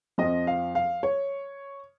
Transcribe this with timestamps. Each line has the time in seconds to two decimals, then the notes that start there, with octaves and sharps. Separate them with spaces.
0.18 F2 F3 D#5
0.47 F5
0.75 F5
1.03 C#5